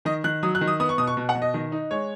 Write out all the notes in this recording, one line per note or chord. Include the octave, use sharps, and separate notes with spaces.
D#3 D#5
D#3 F#6
F#3 D#6
F#6
D#3
D#6
B3 D#6
C#6
B2 D#6
C#6
B2
F#5
B2
D#5
D#3
D#4
G#3 C#5